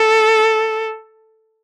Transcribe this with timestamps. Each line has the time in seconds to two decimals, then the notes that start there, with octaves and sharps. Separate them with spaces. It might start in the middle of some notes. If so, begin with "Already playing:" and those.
Already playing: A4